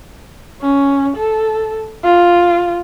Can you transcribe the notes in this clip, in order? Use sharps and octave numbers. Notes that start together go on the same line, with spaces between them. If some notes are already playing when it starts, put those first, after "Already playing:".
C#4
A4
F4